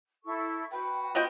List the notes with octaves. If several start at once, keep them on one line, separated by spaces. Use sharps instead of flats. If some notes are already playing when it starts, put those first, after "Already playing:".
E4 A4 C#6
F#4 B4 G5
B3 F4 D#5 G5